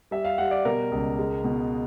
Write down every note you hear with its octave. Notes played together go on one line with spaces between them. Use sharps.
G3 E5
F5
G3 F#5
D5
B2 A#4
C#2
G#3
B2